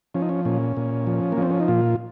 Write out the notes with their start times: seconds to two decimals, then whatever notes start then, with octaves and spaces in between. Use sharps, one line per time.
0.14 F3 C#4
0.22 D#4
0.29 C#4
0.45 A#2 C#4
0.77 A#2
1.07 F3
1.32 A#3
1.38 F3 C4
1.50 C#4
1.60 D#4
1.68 A#2 F4